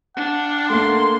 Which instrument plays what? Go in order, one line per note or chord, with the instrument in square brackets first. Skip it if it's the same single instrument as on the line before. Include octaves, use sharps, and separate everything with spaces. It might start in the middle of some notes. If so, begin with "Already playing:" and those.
[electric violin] D4 [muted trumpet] F#5
[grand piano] A3 A#3 [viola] C6